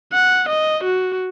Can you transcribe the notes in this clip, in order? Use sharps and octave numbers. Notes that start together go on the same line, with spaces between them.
F#5
D#5
F#4